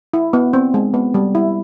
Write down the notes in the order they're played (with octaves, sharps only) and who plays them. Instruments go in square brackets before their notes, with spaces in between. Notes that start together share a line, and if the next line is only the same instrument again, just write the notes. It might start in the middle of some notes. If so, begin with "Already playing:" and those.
[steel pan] E4
B3
C4
G#3
B3
G3
E4